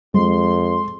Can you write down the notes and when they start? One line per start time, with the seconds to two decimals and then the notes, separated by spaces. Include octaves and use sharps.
0.14 F2 G#3 C6